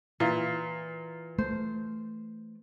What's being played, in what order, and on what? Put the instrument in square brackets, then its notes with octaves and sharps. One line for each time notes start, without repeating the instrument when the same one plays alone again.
[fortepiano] A#2 [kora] E3
[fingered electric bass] A3 [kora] C5